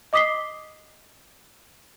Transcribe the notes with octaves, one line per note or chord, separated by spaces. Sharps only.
D#5 D6 D#6 B6 C7 G7